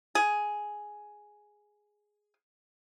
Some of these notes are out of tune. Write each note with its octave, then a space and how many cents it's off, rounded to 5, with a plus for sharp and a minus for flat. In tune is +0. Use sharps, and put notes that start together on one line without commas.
G#4 +5